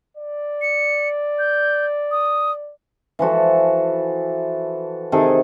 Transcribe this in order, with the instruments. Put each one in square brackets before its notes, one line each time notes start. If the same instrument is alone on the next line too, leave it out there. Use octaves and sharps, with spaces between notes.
[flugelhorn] D5
[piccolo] C#7
G6
D#6
[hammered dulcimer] E3 F3 F#4 A4
C3 D#3 G#4 A4